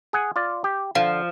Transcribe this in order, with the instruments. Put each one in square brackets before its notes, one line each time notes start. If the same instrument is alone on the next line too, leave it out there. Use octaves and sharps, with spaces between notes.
[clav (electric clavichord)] G#4 F#5 G#5
F4 D5
G4
[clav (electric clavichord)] D3 [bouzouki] F3